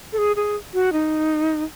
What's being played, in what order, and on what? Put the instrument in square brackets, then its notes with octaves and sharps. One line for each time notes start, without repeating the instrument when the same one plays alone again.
[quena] A4
G#4
G#4
F#4
D#4